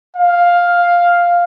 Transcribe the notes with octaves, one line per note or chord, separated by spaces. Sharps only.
F5